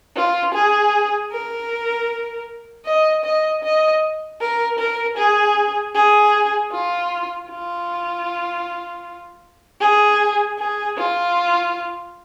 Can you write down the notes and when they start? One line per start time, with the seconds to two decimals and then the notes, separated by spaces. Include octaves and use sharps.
0.16 F4
0.55 G#4
1.32 A#4
2.86 D#5
3.25 D#5
3.63 D#5
4.41 A#4
4.79 A#4
5.18 G#4
5.95 G#4
6.73 F4
7.50 F4
9.81 G#4
10.59 G#4
10.98 F4